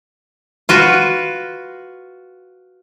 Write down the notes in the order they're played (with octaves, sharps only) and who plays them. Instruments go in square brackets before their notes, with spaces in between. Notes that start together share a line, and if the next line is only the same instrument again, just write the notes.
[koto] F4 F#4 B4